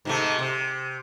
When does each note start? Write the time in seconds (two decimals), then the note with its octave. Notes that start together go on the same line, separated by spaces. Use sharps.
0.05 G#2 C3 A3
0.39 C3